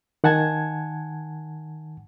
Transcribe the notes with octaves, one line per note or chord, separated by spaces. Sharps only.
D#3 F#5 G#5 A5 G#6